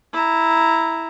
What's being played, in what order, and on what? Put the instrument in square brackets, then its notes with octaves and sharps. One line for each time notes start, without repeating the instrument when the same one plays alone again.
[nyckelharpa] E4 A#5